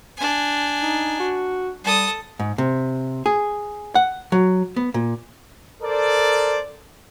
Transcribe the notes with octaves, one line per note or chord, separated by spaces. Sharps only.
D4 G#5
D#4
F#4
G3 A4 D#6
G#2
C3
G#4
F#5
F#3
B3
A#2
A4 A#4 C5 D5